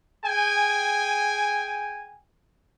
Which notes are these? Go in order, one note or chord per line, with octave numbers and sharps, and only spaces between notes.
G#4 G5 G#5